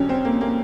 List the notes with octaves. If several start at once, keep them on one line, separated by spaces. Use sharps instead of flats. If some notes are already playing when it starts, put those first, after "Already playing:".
Already playing: F2 D3 F#3 C#4
C4
A#3
A#3